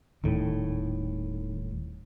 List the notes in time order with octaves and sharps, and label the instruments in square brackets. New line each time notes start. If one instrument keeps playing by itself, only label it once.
[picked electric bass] D#1 A2 [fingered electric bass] D#3